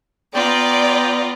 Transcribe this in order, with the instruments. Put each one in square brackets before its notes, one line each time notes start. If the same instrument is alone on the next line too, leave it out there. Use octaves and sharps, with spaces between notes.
[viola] B3 A#5 [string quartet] F4 [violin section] D5 [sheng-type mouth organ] G5